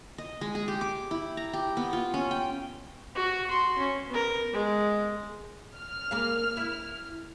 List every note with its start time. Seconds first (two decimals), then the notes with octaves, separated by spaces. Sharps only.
0.18 D#5
0.41 G#3
0.55 G#4
0.68 G4
0.81 D6
1.11 E4
1.37 A#5
1.53 G4
1.77 B3
1.93 F4
2.14 C#4
2.31 G5
3.15 F#4
3.47 F#4 C6
3.78 C#4
4.09 B3 A#4
4.53 G#3
5.76 F6
6.11 A#3 G#4 F5
6.57 E4